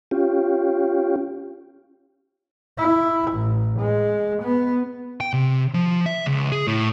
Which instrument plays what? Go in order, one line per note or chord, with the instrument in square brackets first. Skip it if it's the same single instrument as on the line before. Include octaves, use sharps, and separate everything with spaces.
[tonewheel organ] C#4 F4 G4
[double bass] E4
A1
G#3
B3
[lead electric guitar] G5
C3
F3
E5
C#2
G#4
A2